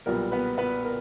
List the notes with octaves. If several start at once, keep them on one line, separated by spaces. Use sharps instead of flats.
B1 A#2 G3 B3 A#4
B3 B4
B3 B4
A#4